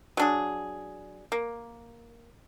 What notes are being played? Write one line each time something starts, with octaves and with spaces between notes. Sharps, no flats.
F#3 D4 G#4
A#3